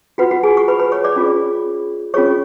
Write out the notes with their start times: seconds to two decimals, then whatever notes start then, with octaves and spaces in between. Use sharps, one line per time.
0.18 F4 F#4 B4 F#5
0.31 F#4 F#5
0.43 G#4 G#5
0.57 C#6
0.68 B4 B5
0.79 B4 B5
0.92 C#5 C#6
1.04 D5 D6
1.16 C#4 F4 G#4
2.14 C#4 F4 G#4 C#5 C#6